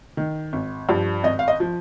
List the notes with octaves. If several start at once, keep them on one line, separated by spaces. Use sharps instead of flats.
D#3
G#1
G2 F3
G#1 D#5
F5
D#5
F3